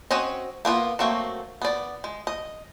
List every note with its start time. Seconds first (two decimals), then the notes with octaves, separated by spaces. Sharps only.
0.11 C4 C#4 F#4 C#5 D#5
0.65 A#3 B3 F4 B4
0.99 F#3 A3 A#3 C4 F#4
1.62 B3 D5
2.04 G#3
2.27 D#5